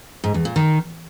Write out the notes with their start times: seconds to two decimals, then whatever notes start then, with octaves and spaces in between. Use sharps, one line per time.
0.24 G#2
0.34 E2
0.45 A#2
0.56 D#3